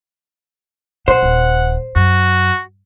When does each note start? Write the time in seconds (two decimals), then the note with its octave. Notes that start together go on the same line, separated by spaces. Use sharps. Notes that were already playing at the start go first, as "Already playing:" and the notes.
1.08 B2 C5 F#5
1.23 D#1
1.96 F#2 F#4